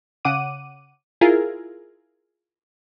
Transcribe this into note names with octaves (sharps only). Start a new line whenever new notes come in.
C#3 F#5 D6 D#7
E4 F4 G#4 A#4